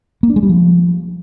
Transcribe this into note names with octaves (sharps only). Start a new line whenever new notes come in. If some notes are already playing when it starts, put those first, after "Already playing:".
A#3
D4
G#3
G3
F3